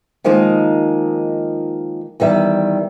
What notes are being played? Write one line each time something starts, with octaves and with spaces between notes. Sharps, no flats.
D#3 F3 G#3 A#3 D#4
E2 D#3 G3 E5